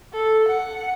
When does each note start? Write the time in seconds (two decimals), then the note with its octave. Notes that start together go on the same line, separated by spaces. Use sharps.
0.13 A4
0.48 F#5